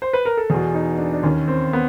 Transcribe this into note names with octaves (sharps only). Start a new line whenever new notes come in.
C5
B4
A#4
A4
E2 B2 G#4
D#4
D4
D4
D#2 D#3 C#4
C4
B3